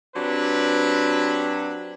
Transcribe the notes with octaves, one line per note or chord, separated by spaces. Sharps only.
F#3 C4 D4 G4 B4